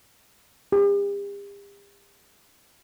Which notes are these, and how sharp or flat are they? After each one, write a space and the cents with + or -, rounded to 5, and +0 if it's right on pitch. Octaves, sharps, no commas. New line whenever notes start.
G4 +45